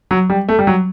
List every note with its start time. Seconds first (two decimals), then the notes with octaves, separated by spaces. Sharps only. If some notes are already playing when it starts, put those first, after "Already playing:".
0.11 F#3
0.30 G3
0.48 A3
0.59 G3
0.67 F#3